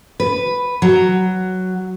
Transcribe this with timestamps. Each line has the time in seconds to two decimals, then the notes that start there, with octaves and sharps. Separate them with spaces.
0.20 B4
0.82 F#3